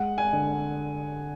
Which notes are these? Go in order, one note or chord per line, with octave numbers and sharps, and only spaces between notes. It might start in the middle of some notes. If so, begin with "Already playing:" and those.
Already playing: G#3 F#5
G#5
D3